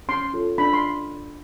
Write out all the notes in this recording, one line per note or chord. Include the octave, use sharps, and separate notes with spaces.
C#4 C6
F4 A4 C#5
D4 B5
C6